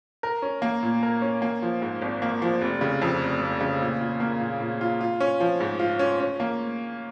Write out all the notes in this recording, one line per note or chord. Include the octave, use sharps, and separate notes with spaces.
A#4
C#4
A#3
A#2
A#4
C#4
A#3
F3
G#2
G#1
A#3
F3
F1
C#3
F2
F1
F1
C#3
A#2
F4
A#3
A#2
A#2
F4
F4
C#4
F3
G#2
F4
C#4
C#4
A#3